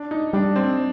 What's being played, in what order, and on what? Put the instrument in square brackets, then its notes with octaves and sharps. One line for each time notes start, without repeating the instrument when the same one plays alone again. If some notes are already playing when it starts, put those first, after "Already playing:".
Already playing: [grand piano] D4
D#4
[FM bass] G3 [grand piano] D4
[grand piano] C4